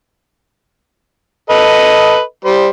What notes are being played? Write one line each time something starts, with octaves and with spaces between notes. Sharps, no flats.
A4 B4 D#5
G3 C5